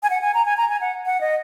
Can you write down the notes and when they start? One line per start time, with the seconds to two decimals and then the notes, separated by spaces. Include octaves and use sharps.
0.03 G#5
0.10 F#5
0.21 G#5
0.34 A#5
0.46 G#5
0.57 A#5
0.69 G#5
0.81 F#5
1.06 F#5
1.21 D#5